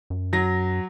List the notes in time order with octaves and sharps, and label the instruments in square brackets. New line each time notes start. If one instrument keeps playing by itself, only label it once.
[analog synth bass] F#2
[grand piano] F#3 A#6